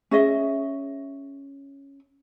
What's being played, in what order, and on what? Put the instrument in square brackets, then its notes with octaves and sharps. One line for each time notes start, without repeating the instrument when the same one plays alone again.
[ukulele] C#4 G#4 D#5 E5